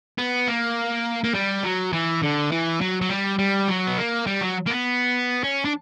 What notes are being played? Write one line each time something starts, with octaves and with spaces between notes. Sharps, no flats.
B3
A#3
A#3
G3
F#3
E3
D3
E3
F#3
F#3
G3
G3
F#3
B3
A#3
G3
F#3
A#3
B3
C#4
D4